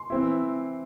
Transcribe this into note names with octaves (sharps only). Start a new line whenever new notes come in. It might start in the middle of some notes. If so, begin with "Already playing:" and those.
Already playing: C6
E3 C4 E4